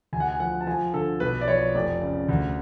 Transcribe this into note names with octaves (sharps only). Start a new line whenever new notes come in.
D2 G#5
F#5
G#5
F3 F#5
A5
F3 G#5
D3 A4
B1 B4
D5
F3 C#5
F1 D5
C#3
D2